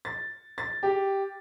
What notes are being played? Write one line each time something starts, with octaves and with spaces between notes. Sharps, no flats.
A6
A6
G4